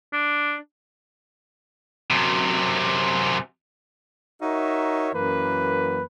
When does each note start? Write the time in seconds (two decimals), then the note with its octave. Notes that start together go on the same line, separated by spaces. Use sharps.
0.13 D4
2.10 F#2 C3
4.42 D#4 F#4 A#4 C#5 E5
5.14 F#2 E3 A#3 B4